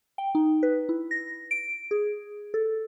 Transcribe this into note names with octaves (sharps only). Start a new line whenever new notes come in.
G5
D#4
B4
E4
A#6
D7
G#4
A4